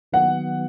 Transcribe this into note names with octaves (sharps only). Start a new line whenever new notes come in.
D#3 F#3 B3 F#5